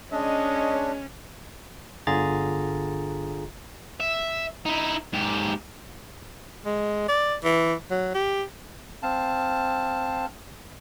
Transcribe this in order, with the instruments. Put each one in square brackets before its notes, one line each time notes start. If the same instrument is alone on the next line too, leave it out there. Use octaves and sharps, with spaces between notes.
[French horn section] G#3 C#5 [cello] C#4 [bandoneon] D4 [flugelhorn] D#5
[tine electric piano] G1 D3 F4 G#4 A#5 A6
[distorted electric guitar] E5
D#4 E4
G#2 G4
[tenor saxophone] G#3
D5
E3
F#3
G4
[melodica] C4 F5 A5